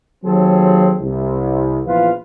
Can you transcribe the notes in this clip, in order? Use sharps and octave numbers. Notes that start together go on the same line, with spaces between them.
D#2 F#3 C4 G#4 A4
C2
A#1 E2 F4 B4 F5